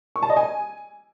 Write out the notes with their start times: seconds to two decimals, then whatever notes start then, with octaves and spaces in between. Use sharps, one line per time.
0.16 C#6
0.23 A5
0.30 D#5
0.37 G#5